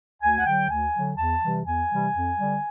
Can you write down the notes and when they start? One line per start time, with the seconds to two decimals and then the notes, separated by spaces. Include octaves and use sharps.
0.22 D2 G#5
0.39 F#5
0.46 D3 F#3 G5
0.70 D2 G#5
0.94 D3 F#3
1.17 E2 A5
1.42 C3 E3 G3
1.65 E2 G#5
1.90 C3 E3 G3
2.13 F2
2.37 D3 G3